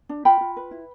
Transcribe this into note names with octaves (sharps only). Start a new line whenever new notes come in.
D4
F4 G5 B5
F4
B4
E4